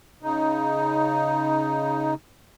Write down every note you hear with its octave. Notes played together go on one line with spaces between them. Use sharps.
C#3 D#4